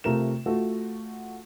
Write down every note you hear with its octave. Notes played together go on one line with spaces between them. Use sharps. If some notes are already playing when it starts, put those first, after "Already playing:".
C3 A3 F4 A#4 E7
A3 F4 F#4 A4